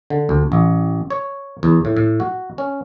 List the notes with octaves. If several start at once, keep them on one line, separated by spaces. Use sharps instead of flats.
D3
D2
A1
C#5
E2
A2
A2
F#4
C#4